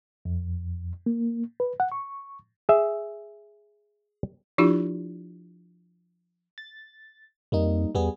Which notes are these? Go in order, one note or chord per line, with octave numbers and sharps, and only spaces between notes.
F2
A#3
B4
F#5
C#6
G#4 E5
F3 D4 E4 F4 G4
A6
F2 G3 A#3 D#4
E2 G3 B3 G#4